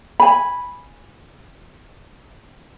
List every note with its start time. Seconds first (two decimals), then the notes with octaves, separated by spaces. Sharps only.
0.20 G#5 B5